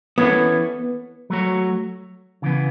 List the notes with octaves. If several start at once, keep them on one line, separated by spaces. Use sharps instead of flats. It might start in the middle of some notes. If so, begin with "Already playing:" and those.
E3 B3 C#4 E4 A4 C#5
F#3 A3 F#4 C#5
C#3 E3 B3